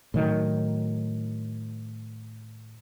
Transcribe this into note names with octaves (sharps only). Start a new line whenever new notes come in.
A2 D#3 F#3